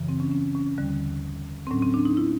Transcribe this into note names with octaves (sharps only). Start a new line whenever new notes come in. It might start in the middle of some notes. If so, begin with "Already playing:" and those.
Already playing: F#2 C#3 E3
C4
C#4
C#4
C#4
D#2 D3 G3
C4
A2 F#3 C#4
C4
D4
D#4
E4